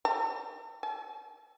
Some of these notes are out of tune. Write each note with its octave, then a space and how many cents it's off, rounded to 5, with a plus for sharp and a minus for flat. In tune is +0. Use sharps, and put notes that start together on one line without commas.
A5 +45
A5 -20